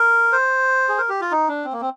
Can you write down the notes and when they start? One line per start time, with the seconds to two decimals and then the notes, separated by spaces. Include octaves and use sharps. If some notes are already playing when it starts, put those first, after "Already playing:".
Already playing: A#4
0.32 C5
0.89 G#4
0.98 A#4
1.09 G4
1.21 F4
1.31 D#4
1.49 D4
1.65 C4
1.73 A#3
1.81 C4